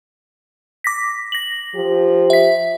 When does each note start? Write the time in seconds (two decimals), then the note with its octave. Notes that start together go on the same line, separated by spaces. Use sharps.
0.84 D6 A#6 B6
1.32 A#6 F#7
1.75 F3 G4
2.30 E5 B6